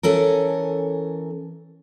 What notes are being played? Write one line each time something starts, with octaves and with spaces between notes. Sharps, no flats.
E3 C#4 A4 A#4